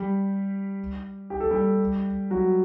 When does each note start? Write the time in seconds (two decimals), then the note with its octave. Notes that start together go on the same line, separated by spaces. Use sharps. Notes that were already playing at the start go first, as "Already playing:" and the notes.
Already playing: G3 G4
1.30 G4
1.40 A4
1.51 G3 G4
2.30 F#3 F#4